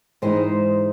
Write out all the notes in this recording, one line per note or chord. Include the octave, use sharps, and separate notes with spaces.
G#2 E3 G#3 D#4 C5